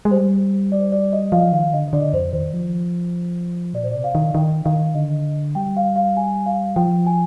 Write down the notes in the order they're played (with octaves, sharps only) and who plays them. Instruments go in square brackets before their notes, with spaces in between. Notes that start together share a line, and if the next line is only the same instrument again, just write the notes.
[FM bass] G#3
[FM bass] G3 [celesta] C5
[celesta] D5
D5
D#5
[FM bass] F3 [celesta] F5
[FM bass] D#3 [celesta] F5
[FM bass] D3 [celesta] D#5
[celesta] D#5
[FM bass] D3 [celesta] D5
[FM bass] F2 [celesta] C5
[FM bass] D#3 [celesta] C5
[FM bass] F3
[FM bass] A#2 [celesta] D5
[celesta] C5
[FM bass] C3 [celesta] D5
[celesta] F5
[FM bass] D#3
[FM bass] D#3 [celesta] G5
[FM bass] D#3 [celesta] F5
[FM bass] D3 [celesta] D#5
[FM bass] G3 [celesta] G5
[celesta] F5
F5
G#5
F5
[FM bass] F3 [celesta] G5
[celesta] G#5